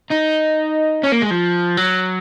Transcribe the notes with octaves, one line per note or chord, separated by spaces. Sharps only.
D#4
C#4
A#3
G#3
F3
F#3